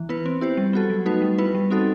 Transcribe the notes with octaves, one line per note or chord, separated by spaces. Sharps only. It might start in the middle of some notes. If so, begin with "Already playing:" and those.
Already playing: E3
B3 E4 B4
C4
E4 G4 C5
G3
B3 F#4 A4
F#3
A3 D#4 F#4 B4
G3
B3 E4 B4
G3
C4 D#4 F#4 A4